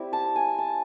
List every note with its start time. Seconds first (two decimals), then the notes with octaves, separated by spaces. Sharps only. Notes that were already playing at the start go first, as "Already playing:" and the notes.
Already playing: G3 C4 E4
0.13 A5
0.36 G#5
0.58 A5